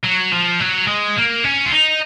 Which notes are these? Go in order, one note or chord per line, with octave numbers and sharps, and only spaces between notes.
F#3
F3
F#3
G#3
A#3
C#4
F4
D#4